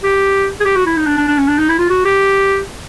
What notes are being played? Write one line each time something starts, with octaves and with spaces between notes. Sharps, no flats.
G4
G#4
G4
F#4
E4
D#4
D4
D4
D4
C#4
D4
D#4
E4
F4
F#4
G4